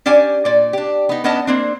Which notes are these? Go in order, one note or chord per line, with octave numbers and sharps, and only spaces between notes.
C#4 D4 G4 D5 G#5
A#2 D5
D4 G4
B3 D#4
B3 C#4 D4 D#5 F#5 A5
A#3 C4 D4